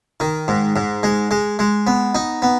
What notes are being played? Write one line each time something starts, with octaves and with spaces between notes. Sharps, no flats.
D#3
G#2
G#2
G#3
G#3
G#3
B3
D#4
B3